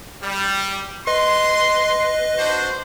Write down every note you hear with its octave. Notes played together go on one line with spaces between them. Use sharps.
G3
B4 D#5 C6
D4 F#4 C5